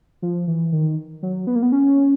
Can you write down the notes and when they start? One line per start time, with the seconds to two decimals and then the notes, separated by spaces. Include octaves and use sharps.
0.22 F3
0.47 E3
0.72 D#3
1.23 F#3
1.47 B3
1.55 A#3
1.63 B3
1.72 C#4